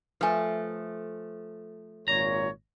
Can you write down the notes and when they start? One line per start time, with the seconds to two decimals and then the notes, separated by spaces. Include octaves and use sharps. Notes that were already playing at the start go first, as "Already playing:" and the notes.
0.21 F3 A3 B4 G#5
2.08 G#1 A#2 C#5 A#5